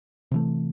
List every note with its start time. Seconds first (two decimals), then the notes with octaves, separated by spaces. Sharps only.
0.31 C3 E3 A3